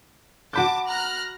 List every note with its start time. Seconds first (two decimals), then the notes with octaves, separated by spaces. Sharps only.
0.53 F#4 A5 B5 D6 G6
0.87 A#5 F6 F#6